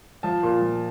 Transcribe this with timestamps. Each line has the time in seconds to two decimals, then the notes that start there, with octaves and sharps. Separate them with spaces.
0.23 F3 A5
0.43 A#2
0.61 F3